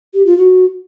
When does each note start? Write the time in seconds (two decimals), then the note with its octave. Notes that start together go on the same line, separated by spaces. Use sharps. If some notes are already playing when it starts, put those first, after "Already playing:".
0.14 G4
0.26 F4
0.38 F#4